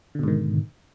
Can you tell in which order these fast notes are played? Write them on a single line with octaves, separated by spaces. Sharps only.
D3 B2 G#2 D#3